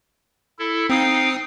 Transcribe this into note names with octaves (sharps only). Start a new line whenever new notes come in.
E4 A4
C4 D#4 F5 G5 D#6 C7